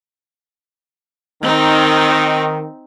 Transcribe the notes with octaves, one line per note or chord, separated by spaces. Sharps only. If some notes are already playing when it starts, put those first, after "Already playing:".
D#3 C4 D#4